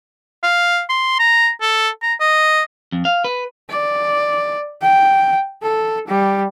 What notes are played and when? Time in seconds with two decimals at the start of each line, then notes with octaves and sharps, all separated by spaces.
0.43 F5
0.89 C6
1.19 A#5
1.61 A4
2.02 A#5
2.20 D#5
2.92 F2
3.05 F5
3.24 B4
3.69 D5
4.82 G5
5.62 A4
6.08 G3